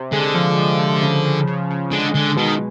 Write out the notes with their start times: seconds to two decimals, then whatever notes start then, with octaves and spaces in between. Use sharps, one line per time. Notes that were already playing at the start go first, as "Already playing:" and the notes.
Already playing: C3
0.12 D3 G#3
0.34 F3
0.57 F3
0.80 F3
1.02 C#3
1.25 C#3
1.47 C#3
1.70 C#3
1.92 D3 G#3
2.15 D3 G#3
2.37 B2 D#3